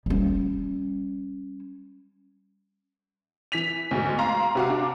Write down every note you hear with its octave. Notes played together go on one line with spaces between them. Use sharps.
G3 C#4
E3 B6 F7
D2 G#2 B2
F5 A#5 C6
C3 F#4 F5
D4